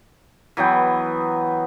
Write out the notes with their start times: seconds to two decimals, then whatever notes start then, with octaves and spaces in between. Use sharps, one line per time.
0.57 E3 F#3 B3 G5